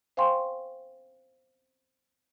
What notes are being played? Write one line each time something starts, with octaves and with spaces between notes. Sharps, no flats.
C5 F5 G5 G#5 C6 C#6